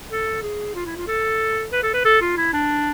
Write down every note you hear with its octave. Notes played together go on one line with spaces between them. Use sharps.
A4
G#4
F4
E4
F4
A4
B4
A4
B4
A4
F4
E4
D4